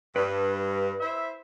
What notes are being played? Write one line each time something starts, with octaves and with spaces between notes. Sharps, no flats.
G2 B4
E4 C5 E5